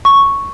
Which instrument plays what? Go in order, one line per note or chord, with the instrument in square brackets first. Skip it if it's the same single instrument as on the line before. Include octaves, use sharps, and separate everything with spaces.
[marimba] C#6